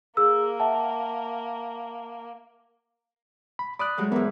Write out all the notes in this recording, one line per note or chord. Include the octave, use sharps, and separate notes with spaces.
A#3 G#4 E6
E5 F#5 A5
B5
D5 B5 D#6 F#6
F#3 G#3 A3
G#2 E3 B3 A#4